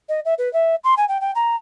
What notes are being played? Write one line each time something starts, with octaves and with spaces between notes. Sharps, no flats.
D#5
E5
B4
E5
C6
G#5
G5
G5
A#5